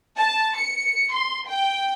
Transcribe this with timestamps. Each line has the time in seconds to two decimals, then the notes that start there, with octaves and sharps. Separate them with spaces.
0.18 A5
0.57 C#7
1.13 C6
1.47 G5